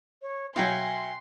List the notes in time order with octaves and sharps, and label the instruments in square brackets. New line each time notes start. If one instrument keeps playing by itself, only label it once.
[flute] C#5
[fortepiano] B2 F#3 [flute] E5 [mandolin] F5 G5 G#5 [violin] C6